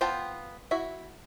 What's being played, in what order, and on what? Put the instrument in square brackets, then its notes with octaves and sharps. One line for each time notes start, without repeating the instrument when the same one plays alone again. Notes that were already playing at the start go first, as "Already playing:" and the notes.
[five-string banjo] B3 F4 C5 G5 A5
E4 F#4 E5